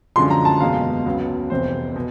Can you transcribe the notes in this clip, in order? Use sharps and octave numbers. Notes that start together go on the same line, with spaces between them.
F#2 D3 F3 G#3 C6
A#5
A5
F#1 E2 B2 G#3 F5
C#2 C#3 F#3 B3
F1 E2 C3 C5
B2